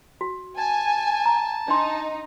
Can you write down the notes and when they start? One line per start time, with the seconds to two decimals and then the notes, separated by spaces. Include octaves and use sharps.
0.21 F#4
0.57 G#5 A5
1.26 A#5
1.68 D4 D#4 C6